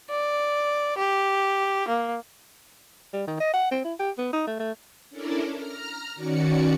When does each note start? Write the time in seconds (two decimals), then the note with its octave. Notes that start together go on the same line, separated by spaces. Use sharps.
0.11 D5
0.98 G4
1.88 A#3
3.13 G3
3.27 D#3
3.40 D#5
3.53 F#5
3.71 C4
3.84 E4
3.99 G4
4.18 B3
4.33 D#4
4.47 A3
4.59 A3
5.10 C#4 D4 E4 A4 A#4 D5
5.55 A#5 F6
6.15 D#3 C#4 F#4 D5 C#7